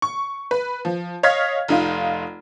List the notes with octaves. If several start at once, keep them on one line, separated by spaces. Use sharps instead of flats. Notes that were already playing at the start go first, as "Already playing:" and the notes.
C#6
B4
F3
C#5 D#5 F5 F6 G#6 B6
F1 D#4 F4